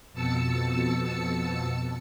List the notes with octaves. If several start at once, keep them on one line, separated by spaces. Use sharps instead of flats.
F2 B2 A5 E6 C#7